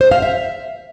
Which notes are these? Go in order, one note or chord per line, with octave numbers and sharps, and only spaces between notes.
C5
F5
E5